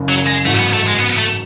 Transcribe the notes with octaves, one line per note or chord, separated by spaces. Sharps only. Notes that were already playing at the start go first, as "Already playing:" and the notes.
Already playing: F#1 F#2 C#3
F#3
G#3
A1 G#2 F#3 A3
B3
A3
G#3
B3
A3